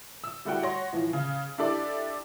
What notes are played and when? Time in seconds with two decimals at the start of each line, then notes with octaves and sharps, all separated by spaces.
0.24 E6
0.45 G3 A3 E4 F#4 F#5 G5
0.63 C#5 F#5 C6 A#6
0.93 A2 E3 F3
1.13 C#3
1.58 D4 E4 G4 A4 D5